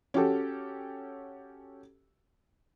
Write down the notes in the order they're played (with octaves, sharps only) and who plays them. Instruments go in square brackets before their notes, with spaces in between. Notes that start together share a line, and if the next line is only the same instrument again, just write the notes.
[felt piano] C#4 F#4 G4 A4